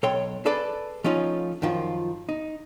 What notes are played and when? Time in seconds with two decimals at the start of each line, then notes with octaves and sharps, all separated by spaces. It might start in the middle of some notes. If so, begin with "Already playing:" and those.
0.03 B1 A4 C#5 G5 C6
0.45 G#4 A4 B4 D5 A5
1.04 F3 A3 C#4 D#4 F4
1.62 F#2 D#3 F3 F4
2.29 D#4